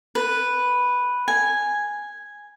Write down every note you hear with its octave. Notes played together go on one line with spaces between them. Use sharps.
B4
G#5